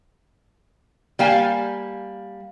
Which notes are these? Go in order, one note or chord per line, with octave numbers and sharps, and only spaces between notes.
G3 A#3 F5 G#5